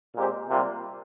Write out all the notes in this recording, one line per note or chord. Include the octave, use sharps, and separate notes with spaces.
A#2 G#3 C4 G4 C5
C3 G3 A#3 F4